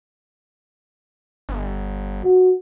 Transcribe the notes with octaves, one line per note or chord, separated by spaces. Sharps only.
G1
F#4